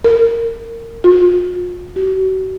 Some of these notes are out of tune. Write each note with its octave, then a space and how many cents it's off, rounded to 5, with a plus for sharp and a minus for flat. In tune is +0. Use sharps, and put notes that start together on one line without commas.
A#4 -25
F4 +40
F#4 +35